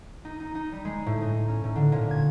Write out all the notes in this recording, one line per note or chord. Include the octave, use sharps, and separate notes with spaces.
D#4
D#4
D#4
G3
G#3
A2
D#4
C#4
A2
D3
A#2
G#6